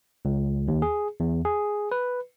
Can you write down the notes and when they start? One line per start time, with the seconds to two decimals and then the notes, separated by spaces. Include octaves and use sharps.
0.25 C#2
0.68 D#2
0.82 G#4
1.20 E2
1.45 G#4
1.92 B4